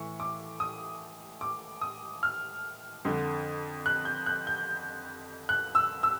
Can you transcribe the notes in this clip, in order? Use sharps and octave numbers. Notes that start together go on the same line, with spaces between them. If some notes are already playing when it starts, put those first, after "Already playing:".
Already playing: A2 E3 C#6
D6
D#6
D6
D#6
F6
F2 D3
F#6
G6
F#6
G6
F#6
E6
E6